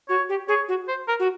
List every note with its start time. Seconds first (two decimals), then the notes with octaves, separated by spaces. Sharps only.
0.09 F#4 C#5
0.29 G4
0.48 G#4 C#5
0.68 F#4
0.88 C5
1.08 A#4
1.20 F#4